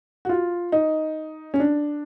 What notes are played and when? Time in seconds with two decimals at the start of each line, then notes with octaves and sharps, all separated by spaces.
0.25 F#4
0.29 F4
0.72 D#4
1.54 C#4
1.60 D4